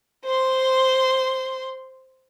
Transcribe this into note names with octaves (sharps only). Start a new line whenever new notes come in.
C5 C6